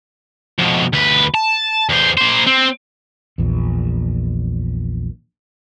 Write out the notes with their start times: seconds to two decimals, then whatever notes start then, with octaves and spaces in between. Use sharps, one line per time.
0.59 F2 B2
0.93 D2 B4
1.34 A5
1.89 E2 C5
2.17 A#3 C5
2.47 C4
3.38 A#1 E2